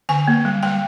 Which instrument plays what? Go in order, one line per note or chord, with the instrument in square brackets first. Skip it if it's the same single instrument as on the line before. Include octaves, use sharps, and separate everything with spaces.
[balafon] D3 G#5
A#3
G3
G3 G5